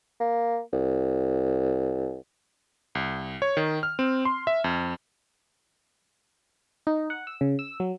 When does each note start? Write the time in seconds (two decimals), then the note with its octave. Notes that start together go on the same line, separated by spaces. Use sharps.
0.20 A#3
0.73 C2
2.95 C2
3.42 C#5
3.57 D#3
3.83 F6
3.99 C4
4.25 C6
4.47 E5
4.64 F2
6.87 D#4
7.10 F#5
7.27 E6
7.41 C#3
7.59 E6
7.80 F#3